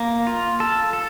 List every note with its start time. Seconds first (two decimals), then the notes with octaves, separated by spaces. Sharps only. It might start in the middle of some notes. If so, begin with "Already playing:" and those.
Already playing: A#3
0.27 F4
0.60 A4
0.93 A4